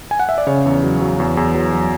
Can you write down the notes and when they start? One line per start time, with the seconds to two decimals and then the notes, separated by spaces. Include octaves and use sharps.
0.11 G#5
0.20 F#5
0.29 E5
0.38 D5
0.47 C#3 C#5
0.66 E2
0.83 F#3
1.02 F#3
1.20 E2
1.37 E2
1.54 F#3
1.74 F#3